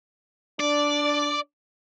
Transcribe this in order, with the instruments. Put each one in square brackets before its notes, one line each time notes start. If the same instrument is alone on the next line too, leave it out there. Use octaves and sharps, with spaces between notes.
[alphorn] D4 [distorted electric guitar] D5